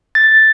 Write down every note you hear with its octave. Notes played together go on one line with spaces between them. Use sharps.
A6